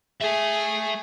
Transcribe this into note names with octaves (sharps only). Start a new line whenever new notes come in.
A3 G#4 E5